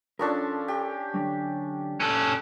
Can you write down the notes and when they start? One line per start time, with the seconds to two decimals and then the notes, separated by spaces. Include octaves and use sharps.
0.19 F3 C#4 D4 A4 A#4
0.68 G4
1.14 D3 F#3
2.00 C#4 A4